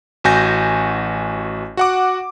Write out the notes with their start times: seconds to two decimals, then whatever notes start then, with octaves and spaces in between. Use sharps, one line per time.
0.24 A1 F#4 G#5 G6 A#6
1.77 F#4 F#5 D6